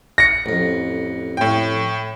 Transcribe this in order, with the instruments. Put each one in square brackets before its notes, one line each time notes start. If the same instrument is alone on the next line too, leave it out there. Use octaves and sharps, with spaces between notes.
[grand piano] A#6 C#7
[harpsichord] A1 F2
[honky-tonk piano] A2 G5